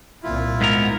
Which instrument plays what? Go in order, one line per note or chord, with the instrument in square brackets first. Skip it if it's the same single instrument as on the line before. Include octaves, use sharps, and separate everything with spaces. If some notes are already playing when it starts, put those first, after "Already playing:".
[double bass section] C2 A#2 [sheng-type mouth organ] E4 F4
[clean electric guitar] G#2 B3 A#4